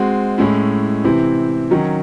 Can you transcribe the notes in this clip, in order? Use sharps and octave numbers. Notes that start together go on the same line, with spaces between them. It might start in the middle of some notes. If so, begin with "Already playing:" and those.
Already playing: G#3 C4 F#4
A2 G#3 C#4 E4
C3 E3 C4 E4
D#3 F#3 C#4